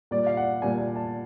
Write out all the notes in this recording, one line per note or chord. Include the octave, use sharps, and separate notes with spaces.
A#2 G3 D5
F5
F#5
A#2 G3 G#5
G#5
A5